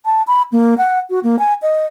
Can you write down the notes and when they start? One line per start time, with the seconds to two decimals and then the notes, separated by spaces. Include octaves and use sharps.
0.05 A5
0.27 B5
0.52 A#3
0.78 F#5
1.10 F#4
1.23 A#3
1.39 G#5
1.62 D#5